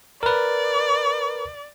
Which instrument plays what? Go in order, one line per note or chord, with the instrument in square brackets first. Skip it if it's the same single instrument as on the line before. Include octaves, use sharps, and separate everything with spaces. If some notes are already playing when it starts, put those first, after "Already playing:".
[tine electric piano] A#4 B4 [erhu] D5